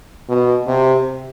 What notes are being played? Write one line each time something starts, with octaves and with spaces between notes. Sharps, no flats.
B2
C3